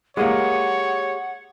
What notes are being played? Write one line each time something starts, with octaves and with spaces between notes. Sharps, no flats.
G#3 A#3 G4 G#4 C#5 F#5